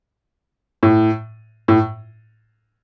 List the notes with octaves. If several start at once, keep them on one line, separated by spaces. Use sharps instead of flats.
A2
A2